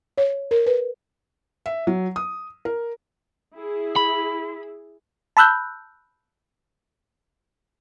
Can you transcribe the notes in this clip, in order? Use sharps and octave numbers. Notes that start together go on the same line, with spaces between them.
C#5
A#4
B4
E5
F#3
D#6
A#4
E4 G#4
B5
A5 B5 E6 F#6 G6